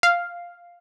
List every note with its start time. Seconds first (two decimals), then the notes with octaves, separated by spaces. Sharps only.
0.03 F5